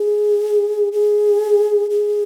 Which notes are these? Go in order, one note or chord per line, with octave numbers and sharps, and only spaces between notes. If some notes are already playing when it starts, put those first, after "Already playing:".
Already playing: G#4
G#4
G#4